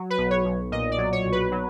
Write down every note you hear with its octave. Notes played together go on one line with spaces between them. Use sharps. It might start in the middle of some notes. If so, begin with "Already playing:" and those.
Already playing: F#3
B4
B1
C#5
B1
A#2 D#5
D5
F#3
C#5
B1
B4
F#3